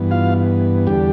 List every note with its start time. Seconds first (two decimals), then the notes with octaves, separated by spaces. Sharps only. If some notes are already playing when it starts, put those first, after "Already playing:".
Already playing: G2 E3 B3
0.11 F4 F5
0.87 E2 D3 G3 G4